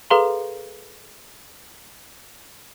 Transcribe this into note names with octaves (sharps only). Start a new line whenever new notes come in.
G#4 A4 B4 F5 A#5 C6